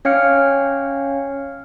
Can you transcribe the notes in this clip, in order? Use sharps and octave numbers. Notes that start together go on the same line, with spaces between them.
C#4 C#5 F5 G5 F6 C#7